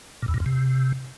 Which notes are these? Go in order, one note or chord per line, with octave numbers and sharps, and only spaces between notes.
A#2
E2
A#2
F2
C3